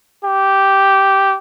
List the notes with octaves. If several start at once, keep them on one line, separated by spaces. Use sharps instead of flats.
G4